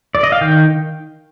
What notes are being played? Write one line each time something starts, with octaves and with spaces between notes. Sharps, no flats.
D5
D#5
F5
D#3 G5